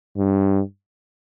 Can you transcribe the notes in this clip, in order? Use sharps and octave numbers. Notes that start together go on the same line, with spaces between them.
G2